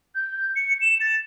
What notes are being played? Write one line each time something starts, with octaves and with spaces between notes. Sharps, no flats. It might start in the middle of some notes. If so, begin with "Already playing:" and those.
G6
C#7
E7
A6